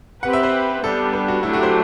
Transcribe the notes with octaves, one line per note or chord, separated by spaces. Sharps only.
C4 G4 B4 F#5
E5
C5
G3 B3 D4 A4
B4
F#4
F#3 A3 D4 E4 G4
F#4
C5